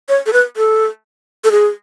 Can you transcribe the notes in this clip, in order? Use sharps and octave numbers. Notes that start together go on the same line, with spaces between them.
C#5
A4
B4
A4
A4
G#4